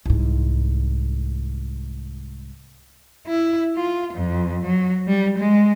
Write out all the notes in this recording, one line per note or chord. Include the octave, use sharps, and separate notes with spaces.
C2 G#2
E4
F4
F2
F#3
G3
G#3